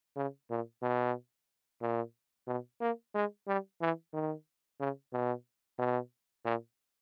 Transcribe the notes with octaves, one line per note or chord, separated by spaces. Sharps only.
C#3
A#2
B2
A#2
B2
A#3
G#3
G3
E3
D#3
C#3
B2
B2
A#2